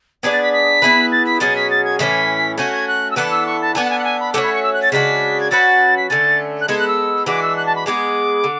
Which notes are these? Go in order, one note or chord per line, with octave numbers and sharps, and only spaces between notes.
B3 D4 G#4 D5 G#6
A6
B6
B6
B3 E4 G#4 B4
A6
B6
B2 F#3 C#4 G#4 A6
B6
A6
G#6
A2 E3 A3 C#4 B6
A3 C#4 F#4 G#6
G#6
F#6
E6
E3 B3 D4 A4 F#6
E6
C#6
A5
B3 D4 A4 G#5
F#5
G#5
F#5
G#5
B5
A3 C#4 F#4 C#5 D6
B5
C#6
E6
F#6
A6
C#3 G#3 D4 F#4 B6
G#6
F#3 C#4 F#4 B4 A6
B6
D3 A3 C#4 A6
F#6
G#3 B3 E4 A4 G#6
F#6
E6
E3 G#3 D4 F#4 D6
E6
F#6
A5
B5
G#3 B3 E4 G#4 D6
D3